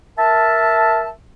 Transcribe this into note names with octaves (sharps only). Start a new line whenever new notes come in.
A#4 E5 A5